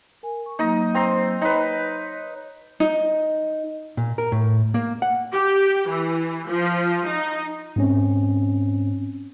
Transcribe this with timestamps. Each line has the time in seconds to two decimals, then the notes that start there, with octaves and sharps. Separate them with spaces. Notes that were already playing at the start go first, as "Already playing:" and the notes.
0.23 A#4 G#5
0.46 C#6
0.59 F#3 A#3 D#4 D#5
0.94 C4 A#5 C6
1.41 D#4 B4 C#5
2.80 D#4
3.97 A#2
4.18 A#4
4.32 A2
4.74 A#3
5.02 F#5
5.32 G4
5.89 E3
6.48 F3
7.07 D#4
7.76 G#2 C4 C#4